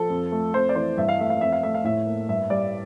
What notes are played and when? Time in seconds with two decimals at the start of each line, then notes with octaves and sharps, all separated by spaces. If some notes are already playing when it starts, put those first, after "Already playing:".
Already playing: F3 A4
0.10 F2
0.32 A3
0.54 F2 C5
0.69 D5
0.75 E3 C5
0.97 G2 E5
1.09 F5
1.19 A3 E5
1.30 F5
1.41 F2 E5
1.52 F5
1.63 A3 E5
1.74 F5
1.84 A2 E5
2.07 A#3
2.29 G2 E5
2.50 G3 D5